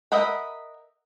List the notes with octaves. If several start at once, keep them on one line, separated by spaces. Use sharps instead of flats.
A#4 D#5 E5 F#5 B5